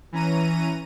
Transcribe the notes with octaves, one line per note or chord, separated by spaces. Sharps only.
E3 C#4 A#5 D#7